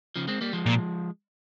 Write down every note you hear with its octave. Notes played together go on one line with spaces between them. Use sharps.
C#3 F3
G#3 C4
G3 A#3
F3 G#3
A#2